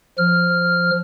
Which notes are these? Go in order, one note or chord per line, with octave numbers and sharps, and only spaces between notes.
F3 F6